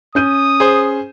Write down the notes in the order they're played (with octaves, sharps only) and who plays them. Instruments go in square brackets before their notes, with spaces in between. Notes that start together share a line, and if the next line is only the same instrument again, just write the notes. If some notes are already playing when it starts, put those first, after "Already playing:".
[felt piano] C#4 G6 D#7 [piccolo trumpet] D#6
[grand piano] G#4 C5